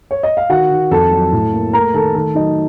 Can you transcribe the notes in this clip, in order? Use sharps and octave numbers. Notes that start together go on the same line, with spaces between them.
C#5
D#5
F5
D#3 F#4 F#5
D#3
F2 A4 A5
F#3
A2
A#3
A3 A#4 A#5
D#3 A4 A5
D#3 A4 A5
F#3 D#4 D#5